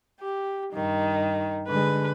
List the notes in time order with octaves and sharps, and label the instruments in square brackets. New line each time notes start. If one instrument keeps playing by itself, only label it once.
[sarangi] G4
[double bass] G2 [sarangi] D#3
[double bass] D3 G#3 [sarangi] B4